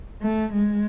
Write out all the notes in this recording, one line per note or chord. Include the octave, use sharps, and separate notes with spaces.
A3
G#3